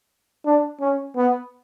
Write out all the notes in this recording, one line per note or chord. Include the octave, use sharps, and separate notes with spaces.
D4
C#4
B3